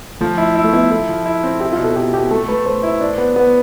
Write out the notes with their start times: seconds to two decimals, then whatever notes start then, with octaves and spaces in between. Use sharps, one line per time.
0.21 F3 A3
0.38 E4
0.55 E4
0.64 A3
0.73 B3 E4
0.90 E4 A4
1.09 F3
1.26 E4
1.43 C4
1.61 E4 G4
1.73 F4
1.78 B2
1.84 A4
1.96 B2 G4
2.13 B2 G4
2.31 A3 A4
2.49 A3 B4
2.66 A3 C5
2.83 E4
3.01 D4
3.18 B3
3.36 B3